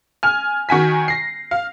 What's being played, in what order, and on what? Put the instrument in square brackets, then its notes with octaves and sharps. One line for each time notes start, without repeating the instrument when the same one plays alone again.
[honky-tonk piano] G#5 F6
D#3 F#4 G#5 B6
A#6 C7
F5